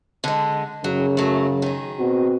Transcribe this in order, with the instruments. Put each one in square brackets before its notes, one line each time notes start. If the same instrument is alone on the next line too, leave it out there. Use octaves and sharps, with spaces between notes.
[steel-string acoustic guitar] D3 G#3
[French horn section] F#2 C#3 [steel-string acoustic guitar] F#3
[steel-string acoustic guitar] F#3 A3
D#3 G#4
[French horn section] B2 C4 F#4